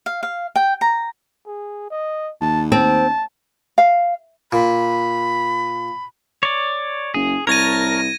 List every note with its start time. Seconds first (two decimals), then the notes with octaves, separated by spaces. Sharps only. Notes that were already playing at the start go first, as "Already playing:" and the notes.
0.06 F5
0.23 F5
0.56 G5
0.81 A#5
1.46 G#4
1.90 D#5
2.41 D#2 A5
2.72 C4 A5
3.78 F5
4.52 A#2 B5
6.43 C#5 D5
7.14 F#1 G#4
7.47 C2 A#4 C#5 A5 G#6 A#6 D#7